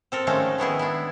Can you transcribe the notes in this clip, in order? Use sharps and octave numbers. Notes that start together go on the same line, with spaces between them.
C4 A4 A#4
D#3 F3 G#3 A3 C#4
D#3 B3 E4 G#4
D4 E4